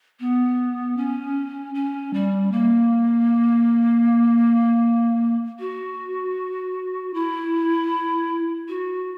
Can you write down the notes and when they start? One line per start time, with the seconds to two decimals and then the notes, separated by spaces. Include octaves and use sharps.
0.20 B3
0.97 C#4
1.75 C#4
2.14 G3
2.52 A#3
5.59 F#4
7.14 E4
8.68 F#4